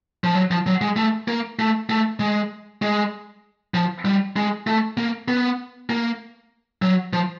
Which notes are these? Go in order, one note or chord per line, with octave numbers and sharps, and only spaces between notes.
F3
F#3
F3
F#3
G#3
A3
A#3
A3
A3
G#3
G#3
F3
G3
G#3
A3
A#3
B3
A#3
F#3
F3